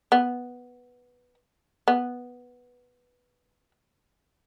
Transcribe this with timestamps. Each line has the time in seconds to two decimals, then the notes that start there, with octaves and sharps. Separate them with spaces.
0.12 B3
1.88 B3